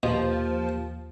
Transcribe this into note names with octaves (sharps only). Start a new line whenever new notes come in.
D#2 B2 F3 A#3 F4 G4